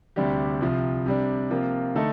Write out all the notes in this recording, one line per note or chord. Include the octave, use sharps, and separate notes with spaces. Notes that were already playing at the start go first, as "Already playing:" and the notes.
D2 C3 G3 D4 G4
C2 C3 F3
C3 G3 D4
C3 F3 A#3 F4
D3 A3 D#4 A4